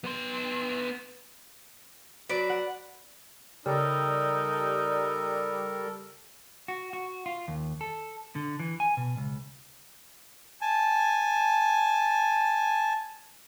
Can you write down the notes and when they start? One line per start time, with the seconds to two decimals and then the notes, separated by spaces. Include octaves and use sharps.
0.04 B3 C6
2.29 F#3 B4 D5 D7
2.49 F#5
3.66 C#3 G3 D#4 A4 A#4
6.68 F#4
6.93 F#4
7.26 F4
7.48 D#2
7.81 A4
8.35 D3
8.60 E3
8.80 G#5
8.97 B2
9.17 C#2
10.61 G#5 A5